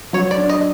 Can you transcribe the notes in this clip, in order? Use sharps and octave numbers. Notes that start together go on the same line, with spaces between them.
F#3 C#5
D5
D4
D#5